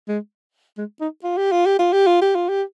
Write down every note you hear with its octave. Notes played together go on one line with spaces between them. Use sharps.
G#3
G#3
D#4
F4
G4
F4
G4
F4
G4
F4
G4
F4
G4